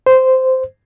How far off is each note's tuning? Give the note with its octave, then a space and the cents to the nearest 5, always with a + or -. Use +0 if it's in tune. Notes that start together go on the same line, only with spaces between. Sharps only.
C5 -10